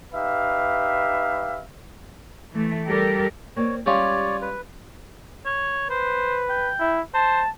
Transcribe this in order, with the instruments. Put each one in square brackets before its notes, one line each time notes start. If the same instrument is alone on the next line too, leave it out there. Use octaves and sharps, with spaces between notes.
[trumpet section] D#4 G4 B4 E5 F5
[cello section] E3 A3
G3 G4 A4 A#4
[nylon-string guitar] A#3 C4 D5 [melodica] C#5
[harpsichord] G3 C#4 F4 [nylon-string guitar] G#3 G4 [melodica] C#5 D5
[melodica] B4
[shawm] C#5
[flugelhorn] B4 [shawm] C5
[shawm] G5
[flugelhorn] E4
[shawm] C5 [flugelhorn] A5